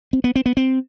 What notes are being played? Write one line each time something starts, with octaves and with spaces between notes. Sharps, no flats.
C4
B3
C4
B3
C4